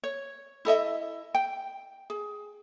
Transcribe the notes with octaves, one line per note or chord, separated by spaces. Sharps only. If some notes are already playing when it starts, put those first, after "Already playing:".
C#5
E4 A4 D#5 E5
G5
G#4